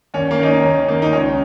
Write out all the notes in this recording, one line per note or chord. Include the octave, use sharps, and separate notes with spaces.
D#2 C#4
A#3
D#3 D#4
C#4
D#2 C#4
D#3 A#3
D#4
C#2 C#4